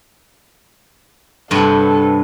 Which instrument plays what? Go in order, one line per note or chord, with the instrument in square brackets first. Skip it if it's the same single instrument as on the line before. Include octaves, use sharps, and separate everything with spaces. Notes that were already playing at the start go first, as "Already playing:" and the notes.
[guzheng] G2 C3 B3 [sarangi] A4